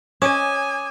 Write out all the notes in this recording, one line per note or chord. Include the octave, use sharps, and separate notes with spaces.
C#4 D#5 G#5 D6 D#6 E7